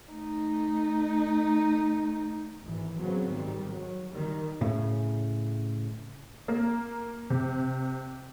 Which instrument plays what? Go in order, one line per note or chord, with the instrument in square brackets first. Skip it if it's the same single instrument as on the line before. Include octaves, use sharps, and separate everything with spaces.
[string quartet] A3 D#4
[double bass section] G#1 E3
C#3 F#3 B3 C4
G#2 D#3 G3
F#3
D#3 G3
[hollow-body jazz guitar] A2 C#3
[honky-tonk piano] A#3
C3